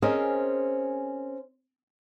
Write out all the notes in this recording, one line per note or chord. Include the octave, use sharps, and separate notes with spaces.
C4 C#4 G#4 A#4 C5 D#5